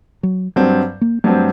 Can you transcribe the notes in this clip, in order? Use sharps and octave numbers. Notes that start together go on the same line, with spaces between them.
F#3
G2 F#3 G3 C4
A#3
G2 F#3 A3 C4